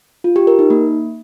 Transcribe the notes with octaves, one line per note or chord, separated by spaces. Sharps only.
F4
G4
A#4
D#4
A#3